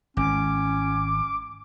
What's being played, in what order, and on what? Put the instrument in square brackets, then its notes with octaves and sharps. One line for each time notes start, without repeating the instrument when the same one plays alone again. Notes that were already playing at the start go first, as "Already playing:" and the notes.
[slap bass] G#1 [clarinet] C#4 [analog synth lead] D6